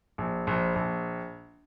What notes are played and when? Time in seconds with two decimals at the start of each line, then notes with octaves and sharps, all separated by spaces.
0.18 A#1
0.47 A#1
0.75 A#1